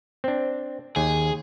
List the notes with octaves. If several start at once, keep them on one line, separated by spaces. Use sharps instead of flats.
C4 D4
D#2 G#4